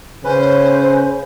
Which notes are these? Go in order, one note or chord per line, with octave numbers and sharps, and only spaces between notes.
C#3 C#4 B4 C5